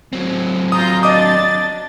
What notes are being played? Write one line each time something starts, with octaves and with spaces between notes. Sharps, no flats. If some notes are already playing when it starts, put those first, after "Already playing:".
F#3 C4
F4 A#5 D#6 G6
D4 D#5 D6 D#6 A6